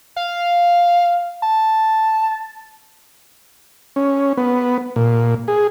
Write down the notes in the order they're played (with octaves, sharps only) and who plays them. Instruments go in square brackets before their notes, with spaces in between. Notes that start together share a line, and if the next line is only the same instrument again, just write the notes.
[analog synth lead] F5
A5
[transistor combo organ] C#4
B3
A#2
G#4